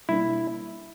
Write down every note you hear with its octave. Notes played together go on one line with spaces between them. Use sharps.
B2 G3 A#3 D4 E4